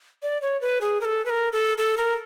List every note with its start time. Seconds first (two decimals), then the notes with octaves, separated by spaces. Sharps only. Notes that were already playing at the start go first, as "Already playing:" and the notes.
0.23 D5
0.42 C#5
0.61 B4
0.81 G#4
1.01 A#4
1.05 A4
1.26 B4
1.30 A#4
1.52 A4
1.78 A4
1.97 A#4